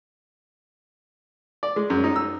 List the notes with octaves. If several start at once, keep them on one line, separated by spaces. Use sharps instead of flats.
D5
G#3
F#2
D#4
E6